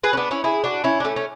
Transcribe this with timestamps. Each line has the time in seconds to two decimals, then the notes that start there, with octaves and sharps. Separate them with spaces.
0.03 G#4 B4
0.13 C#4
0.17 B3 D4
0.31 C#4 E4
0.44 E4 G#4
0.64 D4 F#4
0.84 C#4 E4
1.00 D4
1.04 A3 C#4
1.16 C#4